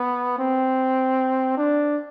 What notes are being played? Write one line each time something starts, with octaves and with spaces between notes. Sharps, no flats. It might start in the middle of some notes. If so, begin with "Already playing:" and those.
Already playing: B3
C4
D4